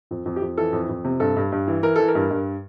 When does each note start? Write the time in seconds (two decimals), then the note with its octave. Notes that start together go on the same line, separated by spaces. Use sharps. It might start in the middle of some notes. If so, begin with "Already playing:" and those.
0.11 F2
0.26 F2
0.36 G4
0.42 F2
0.57 E3 A4
0.73 F2
0.89 F2
1.04 C3
1.20 G2 A4
1.36 G2
1.52 G2
1.68 E3
1.83 E3 A#4
1.96 E3 A4
2.08 A#4
2.15 G2
2.31 G2